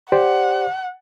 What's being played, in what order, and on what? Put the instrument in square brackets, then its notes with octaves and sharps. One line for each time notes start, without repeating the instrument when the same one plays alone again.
[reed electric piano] G4 C5 D5 [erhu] F#5